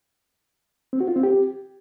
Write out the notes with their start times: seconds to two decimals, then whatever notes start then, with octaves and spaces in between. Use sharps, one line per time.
0.93 C4
1.01 F#4
1.08 F4
1.16 C4
1.23 G4